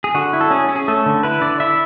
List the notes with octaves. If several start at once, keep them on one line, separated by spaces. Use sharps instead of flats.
G#4
D3 F#4
E4
A4
C#4 G#4
C#4
G#4
A3 A4
D3
E4 B4
D3 D5
E4 E5